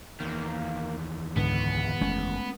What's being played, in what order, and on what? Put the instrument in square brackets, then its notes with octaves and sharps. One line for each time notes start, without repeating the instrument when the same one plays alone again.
[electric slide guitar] E2 D#3 [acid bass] A#3
[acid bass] C#2 [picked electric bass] G#2 D3 [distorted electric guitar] B3
[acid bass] F#1 [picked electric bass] G#3 A3 C#4